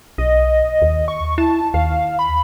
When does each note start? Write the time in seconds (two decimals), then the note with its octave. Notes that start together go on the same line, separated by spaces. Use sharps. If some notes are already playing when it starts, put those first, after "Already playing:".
0.18 B1 D#5
0.82 D#2
1.08 C#6
1.38 E4 A5
1.74 D#2 F5
2.19 B5